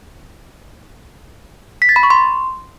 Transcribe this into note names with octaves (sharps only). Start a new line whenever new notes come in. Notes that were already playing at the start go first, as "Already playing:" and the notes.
B6
A6
B5
C#6
C6